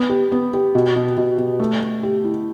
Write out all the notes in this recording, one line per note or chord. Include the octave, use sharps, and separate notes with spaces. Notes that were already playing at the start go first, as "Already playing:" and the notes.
Already playing: B3
G4
B3
G4
B2
B2
B2
B2
A3
A3
G4
E4